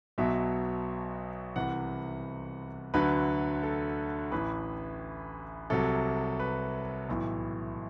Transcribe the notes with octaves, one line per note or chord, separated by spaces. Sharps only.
B1 B2 F#3 E5
C2 C3 E3 F#5
D2 D3 F#3 B4
A4
A1 A2 E3 B4
C2 C3 F#3 A4
B4
B1 A2 E3